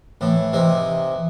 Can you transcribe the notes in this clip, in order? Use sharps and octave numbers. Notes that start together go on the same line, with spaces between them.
A2 E3
C3 E3 D#4